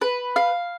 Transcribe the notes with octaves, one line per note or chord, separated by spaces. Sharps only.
B4
F5